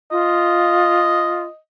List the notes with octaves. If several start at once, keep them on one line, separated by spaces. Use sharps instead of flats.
F4 D#5